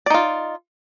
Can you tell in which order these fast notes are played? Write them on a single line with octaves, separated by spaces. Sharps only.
D5 D#4 F4